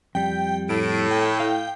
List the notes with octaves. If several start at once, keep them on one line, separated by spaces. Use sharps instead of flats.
F2 G3 G5
A2 D7
G5
F5